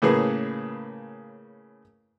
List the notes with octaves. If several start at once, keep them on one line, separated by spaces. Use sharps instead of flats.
A2 C#3 A#3 G#4 B4